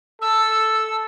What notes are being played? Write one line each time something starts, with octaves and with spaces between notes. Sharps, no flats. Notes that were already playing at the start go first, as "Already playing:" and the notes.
A4 E6